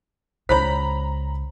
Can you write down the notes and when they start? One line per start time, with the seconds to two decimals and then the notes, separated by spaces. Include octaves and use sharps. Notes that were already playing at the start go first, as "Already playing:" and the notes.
0.49 C#2 C#3 C5 C#5 A#5 B5 B6